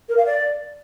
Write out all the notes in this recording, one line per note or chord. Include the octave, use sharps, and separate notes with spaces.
A#4
F5
D5